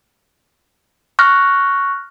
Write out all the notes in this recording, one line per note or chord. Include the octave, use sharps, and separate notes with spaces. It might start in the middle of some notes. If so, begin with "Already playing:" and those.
C#6 F6 F#6 A#6